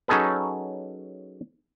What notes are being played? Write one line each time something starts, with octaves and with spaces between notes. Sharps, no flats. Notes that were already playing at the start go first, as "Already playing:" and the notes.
F#3 C#4 D#4 G#4 A4 B4